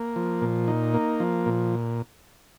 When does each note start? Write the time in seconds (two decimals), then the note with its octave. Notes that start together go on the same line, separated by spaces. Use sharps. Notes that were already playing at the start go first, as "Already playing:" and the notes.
Already playing: A#3
0.16 F3
0.42 A#2
0.68 D#4
0.94 A#3
1.20 F3
1.46 A#2